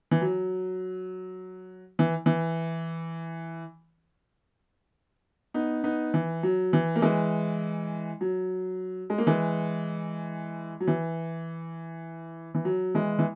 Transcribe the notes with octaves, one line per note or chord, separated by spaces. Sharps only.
E3
F#3
E3
E3
B3 D#4
B3 D#4
E3
F#3
E3
A#3
E3 G#3
F#3
G#3
A#3
E3 G#3
F#3
E3
E3
F#3
E3 G#3
E3